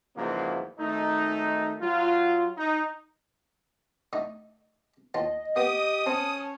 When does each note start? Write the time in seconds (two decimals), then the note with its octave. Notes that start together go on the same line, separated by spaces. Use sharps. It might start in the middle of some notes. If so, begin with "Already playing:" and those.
0.17 E2 G#2 C#3 F3 F#3 A#3
0.79 G#1 D#3 A3 D#4
1.81 F#3 F4
2.57 D#4
4.13 D3 A3 D#4
5.14 D#2 F4 D#5 A5
5.56 A#3 B3 G4 D#6
6.06 C4 C#4 A5